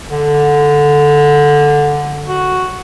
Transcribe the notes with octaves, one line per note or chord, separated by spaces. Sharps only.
D3
F#4